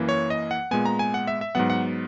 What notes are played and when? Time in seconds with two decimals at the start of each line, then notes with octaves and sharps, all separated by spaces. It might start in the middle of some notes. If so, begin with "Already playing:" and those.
Already playing: F#2 E3 A#3
0.09 C#5
0.30 D#5
0.51 F#5
0.71 A#2 G#3 B3 G#5
0.85 A#5
0.99 G#5
1.14 F#5
1.27 E5
1.41 E5
1.55 G#2 F#3 B3 F#5
1.70 F#5